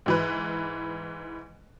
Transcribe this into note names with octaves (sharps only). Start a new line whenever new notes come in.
G#2 E3 B4